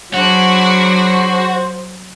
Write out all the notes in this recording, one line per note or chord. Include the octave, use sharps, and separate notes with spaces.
F#3 D4 F#4 G#4 C5 B5